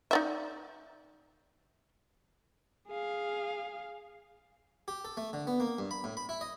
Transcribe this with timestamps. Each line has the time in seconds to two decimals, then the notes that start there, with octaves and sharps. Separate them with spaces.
0.11 D#4 D5 E5
2.88 G#4 F5
4.88 G4
5.05 A4
5.17 A3
5.33 D3
5.47 B3
5.60 A#3
5.78 G2
5.91 B5
6.04 A2
6.17 B5
6.29 E4
6.41 D#5